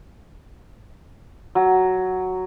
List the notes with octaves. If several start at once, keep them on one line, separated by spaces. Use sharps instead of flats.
F#3